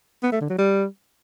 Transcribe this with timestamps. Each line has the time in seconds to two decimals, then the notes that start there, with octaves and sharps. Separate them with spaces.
0.23 B3
0.32 A3
0.41 D3
0.50 F#3
0.59 G3